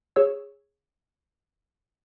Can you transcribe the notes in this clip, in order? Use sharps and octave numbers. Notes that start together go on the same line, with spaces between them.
G#4 C#5 E6